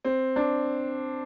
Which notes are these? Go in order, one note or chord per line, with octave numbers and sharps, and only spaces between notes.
C4
D4